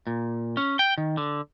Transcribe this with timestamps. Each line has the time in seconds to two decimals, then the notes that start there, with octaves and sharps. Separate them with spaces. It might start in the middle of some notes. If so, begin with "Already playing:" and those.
0.07 A#2
0.57 C#4
0.79 G5
0.98 D#3
1.17 D3